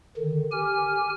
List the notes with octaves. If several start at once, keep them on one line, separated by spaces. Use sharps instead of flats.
D3 D#3
G4 G#5 F6